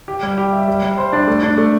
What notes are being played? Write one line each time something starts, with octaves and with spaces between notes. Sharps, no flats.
G4
G3
G4
E5
G3
G3
C5
D4
A3
D4
A3